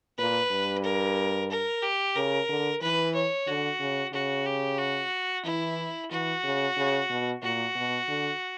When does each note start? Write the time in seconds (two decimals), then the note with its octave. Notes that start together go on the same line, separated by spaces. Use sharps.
0.18 A#2 B4
0.51 G2
0.84 A#4
1.50 A#4
1.83 G4
2.15 C#3 A#4
2.49 D3
2.81 E3 B4
3.15 C#5
3.47 D3 F#4
3.80 C#3
4.13 C#3 F#4
4.46 G4
4.79 F#4
5.45 E3 E4
6.10 E3 F#4
6.44 C#3
6.77 C#3
7.10 B2
7.43 A#2 F#4
7.75 B2
8.08 D3